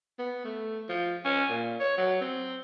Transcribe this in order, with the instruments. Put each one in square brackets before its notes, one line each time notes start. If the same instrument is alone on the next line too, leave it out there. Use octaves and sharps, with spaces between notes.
[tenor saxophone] B3
A3
F3
C#4
A#2
C#5
F#3
C4